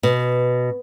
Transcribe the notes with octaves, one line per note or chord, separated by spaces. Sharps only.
B2